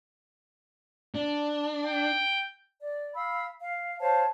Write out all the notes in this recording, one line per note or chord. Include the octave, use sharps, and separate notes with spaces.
D4
G5
D5
F5 B5 E6
F5
C5 C#5 F5 A5